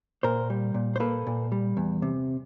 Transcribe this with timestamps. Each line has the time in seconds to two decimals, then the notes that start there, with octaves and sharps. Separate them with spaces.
0.23 A#2 A#4 C5
0.50 G3
0.74 A#2
0.96 C5
1.00 A#3 A4 B4
1.27 A#2
1.52 G3
1.77 E2
2.02 C3